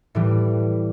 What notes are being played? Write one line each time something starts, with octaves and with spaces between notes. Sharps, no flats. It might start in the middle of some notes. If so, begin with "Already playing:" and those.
A2 E3 G3